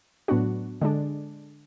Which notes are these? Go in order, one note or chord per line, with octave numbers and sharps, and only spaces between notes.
A2 F#3 B3 D4 F#4
D3 G#3 D4